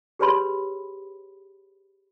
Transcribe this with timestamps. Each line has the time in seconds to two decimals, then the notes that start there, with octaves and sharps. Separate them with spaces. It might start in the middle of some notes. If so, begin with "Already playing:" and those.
0.19 G4 G#4 B4 C#5 B5 C6